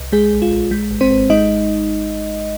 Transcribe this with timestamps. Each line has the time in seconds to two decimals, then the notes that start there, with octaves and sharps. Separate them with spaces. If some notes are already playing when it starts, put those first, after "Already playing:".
Already playing: C2
0.12 G#3 G#4
0.32 A#1
0.42 F4
0.52 A#1
0.71 G#3
0.91 G#1
1.01 C4 C5
1.10 G#1
1.30 G#3 D#4 D#5